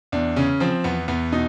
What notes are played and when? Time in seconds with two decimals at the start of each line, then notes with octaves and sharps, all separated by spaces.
0.12 E2 D4
0.36 C#3 C#4
0.60 F3 C4
0.84 E2 B3
1.08 E2 B3
1.32 B2 D#4